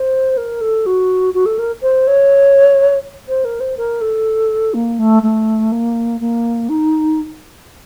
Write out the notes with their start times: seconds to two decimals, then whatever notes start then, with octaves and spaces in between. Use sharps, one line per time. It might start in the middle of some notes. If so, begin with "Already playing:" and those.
Already playing: C5
0.37 A#4
0.61 A4
0.86 F#4
1.34 F#4
1.46 A4
1.59 A#4
1.82 C5
2.07 C#5
3.28 C5
3.45 A#4
3.60 C5
3.77 A#4
4.01 A4
4.74 A#3
4.99 A3
5.23 A3
5.72 A#3
6.21 A#3
6.69 D#4